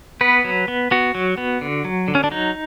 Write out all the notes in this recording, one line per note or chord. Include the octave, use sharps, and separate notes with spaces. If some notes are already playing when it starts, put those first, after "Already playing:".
B3 B4
F#3
B3
B3 F#4
F#3
B3
D3
F#3
D3
C#4
D4
F#3 D#4